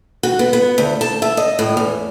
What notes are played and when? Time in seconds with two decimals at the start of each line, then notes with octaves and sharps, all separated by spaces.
0.23 F#4
0.39 B3
0.53 B3
0.78 D2
1.01 A5
1.22 E5
1.37 D#5
1.59 A2
1.77 E2